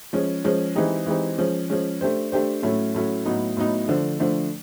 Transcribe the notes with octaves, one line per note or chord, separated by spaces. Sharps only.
F3 G#3 C#4
F3 G#3 C#4
E3 G#3 C4 D#4 G4
E3 G#3 C4 D#4 G4
F3 G#3 C#4
F3 G#3 C#4
A3 D4 G4 C5
A3 D4 G4 C5
A2 F#3 A3 C#4
A2 F#3 A3 C#4
A2 F#3 B3 D#4
A2 F#3 B3 D#4
D3 F3 A3 D4
D3 F3 A3 D4